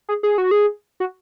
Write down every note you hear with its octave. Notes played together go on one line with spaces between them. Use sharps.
G#4
G#4
F#4
G#4
F#4